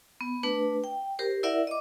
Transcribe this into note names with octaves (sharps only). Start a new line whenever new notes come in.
B3
A3 D4 B4
G5
G4 A#4 C5
E4 A#4 D5 E5 F#5
D#5 D6